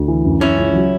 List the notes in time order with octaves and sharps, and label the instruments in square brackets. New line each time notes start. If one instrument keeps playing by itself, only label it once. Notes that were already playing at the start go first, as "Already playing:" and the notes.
Already playing: [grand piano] D2
E3
F#2
[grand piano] E3 [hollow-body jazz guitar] C#4 E4
[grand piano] C#2
F#3